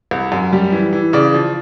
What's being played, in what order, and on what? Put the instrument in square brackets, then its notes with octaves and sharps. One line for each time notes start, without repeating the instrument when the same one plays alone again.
[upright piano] C2
F#2
G3
E3
E3
C#3 D5
F3